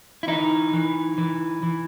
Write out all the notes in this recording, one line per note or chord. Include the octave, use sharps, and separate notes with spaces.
E4
E3 D#4
E3
E3
E3